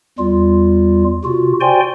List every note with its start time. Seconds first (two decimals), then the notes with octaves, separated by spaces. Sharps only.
0.19 E2 G3 F4
1.24 C3 F4 F#4
1.61 F#4 C5 D5 G5 G#5 C6